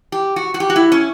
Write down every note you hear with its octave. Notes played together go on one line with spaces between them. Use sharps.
G4
F#4
F#4
G4
F#4
E4
C#4